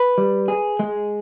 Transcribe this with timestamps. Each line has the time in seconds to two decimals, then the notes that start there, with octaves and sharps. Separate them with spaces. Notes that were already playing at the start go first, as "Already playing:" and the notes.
Already playing: B4
0.18 G3
0.48 G#4
0.79 G#3